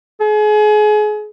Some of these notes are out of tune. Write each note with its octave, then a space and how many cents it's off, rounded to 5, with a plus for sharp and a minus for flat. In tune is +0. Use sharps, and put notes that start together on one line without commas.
G#4 +30